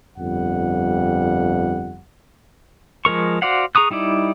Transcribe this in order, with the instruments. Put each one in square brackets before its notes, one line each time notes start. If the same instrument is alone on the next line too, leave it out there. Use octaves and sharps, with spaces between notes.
[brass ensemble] G1 F2 G3 F#5
[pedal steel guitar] F3 G#3 A#4 C#6
F#4 C5 D5 F5 F#5
G#4 A#5 C#6 D#6 F#6
G3 D#4 E4 D5